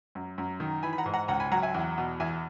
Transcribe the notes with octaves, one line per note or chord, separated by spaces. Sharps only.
F#2
F#2
D#3
E3 G#5 B5
B5
F#5 A#5
G#2
F#5 A#5
C#2 F#5 A#5
G#5 B5
F#3 F#5 A#5
E5 G#5
E2
B2
E2 E5 G#5